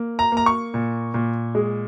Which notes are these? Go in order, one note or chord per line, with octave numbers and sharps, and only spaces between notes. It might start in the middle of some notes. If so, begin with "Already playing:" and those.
Already playing: A#3
A#5
A#3 A#5
C#6
A#2
A#2
G#3